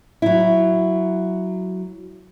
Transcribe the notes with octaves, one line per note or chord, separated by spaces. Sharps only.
F#3 E4